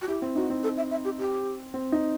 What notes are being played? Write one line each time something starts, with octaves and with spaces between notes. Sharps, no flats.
F#4
E4 G4
C4
D#4 F#4
C4
A4
E5
E5
G4
G4
C4
D#4